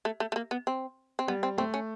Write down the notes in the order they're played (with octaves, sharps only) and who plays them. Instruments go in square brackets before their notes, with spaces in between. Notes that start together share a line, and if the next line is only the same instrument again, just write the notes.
[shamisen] A3
A3
A3
A#3
B3
C4
C4
[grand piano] G3 [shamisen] B3
[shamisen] C4
[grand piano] A3 [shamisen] C4
[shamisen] C#4